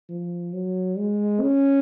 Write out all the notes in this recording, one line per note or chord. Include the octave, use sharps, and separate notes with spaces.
F3
F#3
G#3
C#4